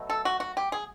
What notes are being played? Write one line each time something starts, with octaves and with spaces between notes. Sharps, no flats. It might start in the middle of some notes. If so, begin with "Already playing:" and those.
Already playing: B2 F#3 A3
A4
F#4
F#4
G4
G#4